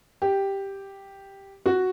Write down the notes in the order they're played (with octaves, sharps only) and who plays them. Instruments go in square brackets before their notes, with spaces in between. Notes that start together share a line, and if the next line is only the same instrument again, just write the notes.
[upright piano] G4
F#4